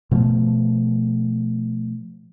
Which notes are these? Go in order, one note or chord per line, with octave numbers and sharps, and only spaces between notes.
B2 F3 A3